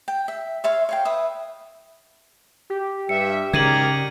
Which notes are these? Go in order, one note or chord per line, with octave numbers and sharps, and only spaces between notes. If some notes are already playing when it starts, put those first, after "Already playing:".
G5
E5
C#5 E5 F5 C6
C#5 F5 G5
B4 E5 D#6
G4
G2 E5 C#7
G#2 C#3 A#4 D5 G#6 D#7 F#7